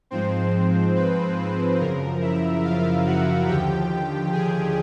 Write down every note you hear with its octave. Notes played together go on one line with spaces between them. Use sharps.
G#2 F3 G#3 C4 C5
B4
F#2 C#3 F3 A#4
E4 E5
F4 F5
F#4 F#5
D#2 D3 F3 G4 G5
G#4 G#5